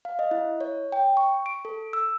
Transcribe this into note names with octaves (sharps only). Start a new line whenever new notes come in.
F5
D#5
E4
C#5
G5
C#6
D7
A4
E6